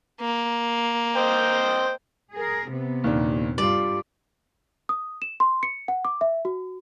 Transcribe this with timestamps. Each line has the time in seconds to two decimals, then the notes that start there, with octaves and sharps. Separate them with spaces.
0.20 A#3
1.16 C5 D#5 G5
2.34 G#4 A#4
2.70 C3 B3
3.04 D#2 A#2 D4
3.58 G2 G3 F4 D5
4.89 D#6
5.22 E7
5.40 C6
5.63 C#7
5.88 F#5
6.05 D6
6.21 E5
6.45 F#4